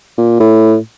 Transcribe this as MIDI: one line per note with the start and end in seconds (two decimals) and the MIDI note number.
0.18 0.36 46
0.40 0.76 45